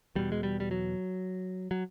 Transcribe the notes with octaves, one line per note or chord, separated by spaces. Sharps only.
E2 B2 G3
G#3
G3
G3
F#3
F#3